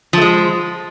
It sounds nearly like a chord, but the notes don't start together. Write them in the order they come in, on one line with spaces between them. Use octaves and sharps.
F3 A3 G#3